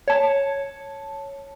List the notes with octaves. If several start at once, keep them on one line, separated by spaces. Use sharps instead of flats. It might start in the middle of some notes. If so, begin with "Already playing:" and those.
C#5 A5